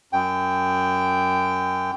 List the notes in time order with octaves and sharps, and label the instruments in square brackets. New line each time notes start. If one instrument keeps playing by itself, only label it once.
[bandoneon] F#2 G5